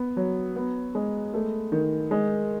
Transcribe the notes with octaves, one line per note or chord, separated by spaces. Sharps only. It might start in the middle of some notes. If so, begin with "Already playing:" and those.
Already playing: B3
F#3
B3
G#3
A3
D#3
G#3